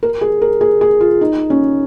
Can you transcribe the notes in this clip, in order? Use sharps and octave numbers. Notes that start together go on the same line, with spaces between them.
A#4
G#4
A#4
G#4
G#4
F4
D#4
C#4